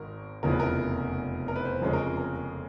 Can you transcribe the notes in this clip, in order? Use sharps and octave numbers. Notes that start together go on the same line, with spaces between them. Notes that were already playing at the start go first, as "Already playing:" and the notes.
Already playing: G#1 G#2 D#3 A#4
F1 E2 C#3 F3 A#4
B4
A#4
A#4
B4
C5
F2 C#3 F3 G#3 C#4 A#4
A#4
A#4